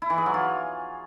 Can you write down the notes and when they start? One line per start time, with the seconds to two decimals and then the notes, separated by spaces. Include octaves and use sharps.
0.02 E4
0.10 E3
0.18 G#4
0.26 F#3
0.34 F4